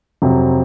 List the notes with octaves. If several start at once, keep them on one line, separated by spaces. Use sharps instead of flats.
F2 C3 F#3